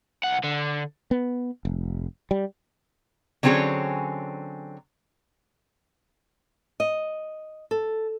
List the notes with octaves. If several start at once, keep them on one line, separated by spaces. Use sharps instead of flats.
C2 F#5
D3
B3
F1
G3
D3 F#3 C4 C#4 G#4 C#5
D#5
A4